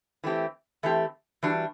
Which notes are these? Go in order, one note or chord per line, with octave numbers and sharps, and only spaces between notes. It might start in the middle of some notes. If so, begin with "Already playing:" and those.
E3 A3 C4 G4
E3 A3 C4 G4
E3 G3 D4 F#4